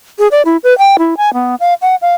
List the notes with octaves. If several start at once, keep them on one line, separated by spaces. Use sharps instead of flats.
G#4
D5
E4
B4
G5
E4
G#5
B3
F5
F#5
F5